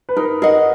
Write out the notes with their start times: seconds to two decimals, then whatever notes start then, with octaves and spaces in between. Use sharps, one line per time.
0.09 B4
0.16 D#4 A#4
0.42 G#4 A#4 D#5 F#5